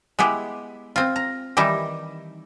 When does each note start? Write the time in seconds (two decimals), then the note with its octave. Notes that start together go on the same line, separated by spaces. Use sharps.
0.19 G#3 B3 E4 G4
0.96 C4 F4
1.16 A#5
1.57 D#3 E3 G3 D#4 E4